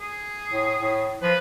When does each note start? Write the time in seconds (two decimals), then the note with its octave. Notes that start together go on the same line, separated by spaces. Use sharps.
0.01 G#4
0.52 A2
0.82 A2
1.23 F3 B4